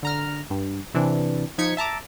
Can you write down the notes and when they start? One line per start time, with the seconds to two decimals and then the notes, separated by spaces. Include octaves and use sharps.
0.03 D3 A#5 F6
0.50 G2
0.94 C3 E3 D4
1.58 F3 D#4 G#6 B6 C#7
1.77 E5 A5 A#5 D6